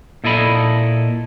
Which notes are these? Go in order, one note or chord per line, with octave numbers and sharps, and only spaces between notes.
A#2 E4 A4 D#5 B5